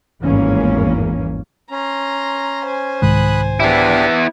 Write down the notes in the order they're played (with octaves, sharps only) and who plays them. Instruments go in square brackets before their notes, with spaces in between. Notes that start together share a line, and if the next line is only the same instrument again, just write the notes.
[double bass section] G#1 E2 G2 E3 A#3 C#4
[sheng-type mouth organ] C#4 [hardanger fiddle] A#5 C6
[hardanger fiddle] C5 G#5
[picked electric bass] C2 G#2 D#3 [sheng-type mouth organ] B5 D#6 F#6
[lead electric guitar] B3 E4 [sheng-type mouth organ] D4 G4